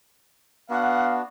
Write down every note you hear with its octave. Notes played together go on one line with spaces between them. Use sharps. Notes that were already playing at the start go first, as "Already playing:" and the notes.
B3 D4 F#4 F5 F#5